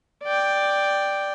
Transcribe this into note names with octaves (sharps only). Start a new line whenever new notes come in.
D5 G5